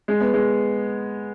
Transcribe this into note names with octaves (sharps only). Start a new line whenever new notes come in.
G#3
B3
G#3